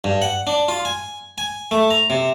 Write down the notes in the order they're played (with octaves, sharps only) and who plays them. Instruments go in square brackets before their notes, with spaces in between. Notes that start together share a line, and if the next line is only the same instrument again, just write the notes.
[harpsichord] G2
F#5
D4
F4
G#5
G#5
A3
A#5
C3